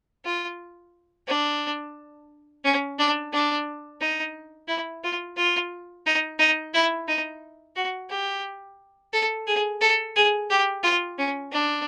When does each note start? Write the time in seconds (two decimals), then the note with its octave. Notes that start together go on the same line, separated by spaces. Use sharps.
0.25 F4
1.27 D4
2.64 C#4
2.98 D4
3.33 D4
4.01 D#4
4.68 E4
5.04 F4
5.37 F4
6.06 D#4
6.39 D#4
6.74 E4
7.08 D#4
7.76 F#4
8.10 G4
9.13 A4
9.47 G#4
9.81 A4
10.16 G#4
10.50 G4
10.83 F4
11.18 C#4
11.52 D4